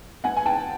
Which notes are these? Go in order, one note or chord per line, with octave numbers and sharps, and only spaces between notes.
B3 F#5 G#5
G#5
G5 A5